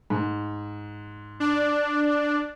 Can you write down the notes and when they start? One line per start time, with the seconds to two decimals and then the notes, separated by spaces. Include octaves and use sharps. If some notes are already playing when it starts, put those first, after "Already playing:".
0.10 G#2
1.40 D4